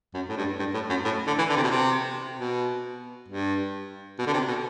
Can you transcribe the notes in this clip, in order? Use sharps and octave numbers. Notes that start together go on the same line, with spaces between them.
F#2
A2
G2
G2
A2
F#2
A2
D3
E3
D3
C3
B2
C3
B2
G2
B2
D3
C3
B2